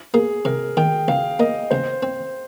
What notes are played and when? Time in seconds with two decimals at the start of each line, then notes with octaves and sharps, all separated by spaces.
0.14 A#3 G#4
0.45 C3 A#4
0.77 D#3 G5
1.08 C#2 F5
1.40 A#3 D#5
1.71 C#2 C5
2.03 C4